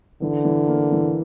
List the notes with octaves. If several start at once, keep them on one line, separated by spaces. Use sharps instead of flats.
D3 E3
E3
A#3
E3